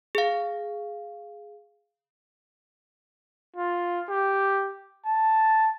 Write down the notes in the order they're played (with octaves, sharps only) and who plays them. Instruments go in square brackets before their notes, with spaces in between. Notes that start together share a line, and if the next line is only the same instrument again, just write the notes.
[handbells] G#4 F5
[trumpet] F4
G4
A5